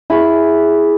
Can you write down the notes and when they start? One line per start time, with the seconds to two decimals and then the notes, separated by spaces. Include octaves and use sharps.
0.10 E4 G#4 B5 C#6